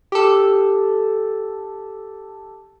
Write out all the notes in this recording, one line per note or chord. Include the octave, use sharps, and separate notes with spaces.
G4 A4